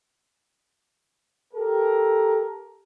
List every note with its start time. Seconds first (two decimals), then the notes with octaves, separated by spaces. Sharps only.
1.54 G4 A4 A#4